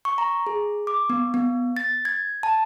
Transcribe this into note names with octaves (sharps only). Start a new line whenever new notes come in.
C#6
A#5
G#4
D6
B3
B3
A6
G#6
A5